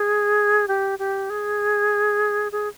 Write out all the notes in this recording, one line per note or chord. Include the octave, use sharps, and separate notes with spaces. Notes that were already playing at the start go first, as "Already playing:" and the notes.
Already playing: G#4
G4
G4
G#4
G#4